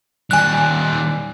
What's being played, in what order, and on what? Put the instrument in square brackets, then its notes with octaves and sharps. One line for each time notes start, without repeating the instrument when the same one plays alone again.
[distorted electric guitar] D#2 G3 [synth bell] G#5 F#6